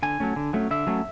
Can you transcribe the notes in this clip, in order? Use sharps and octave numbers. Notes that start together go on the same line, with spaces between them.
D3 G#5
F#3 A3 C#4
D3
F#3 A3 C#4
D3 E5
F#3 A3 C#4